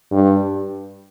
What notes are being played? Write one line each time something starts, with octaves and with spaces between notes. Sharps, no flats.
G2